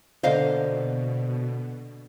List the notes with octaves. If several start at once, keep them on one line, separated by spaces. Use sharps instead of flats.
B2 D3 A#3 C5 D#5 F5